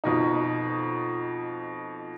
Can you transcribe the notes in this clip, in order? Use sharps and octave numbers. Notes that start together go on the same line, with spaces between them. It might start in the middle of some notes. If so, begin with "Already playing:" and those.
F2 B2 D#4